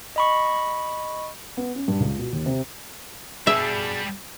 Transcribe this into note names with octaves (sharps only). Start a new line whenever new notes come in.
D#5 B5 C#6
B3
C#4
G2
C#2
B2
D#2
C3
B2 G3 D4 G#4 E5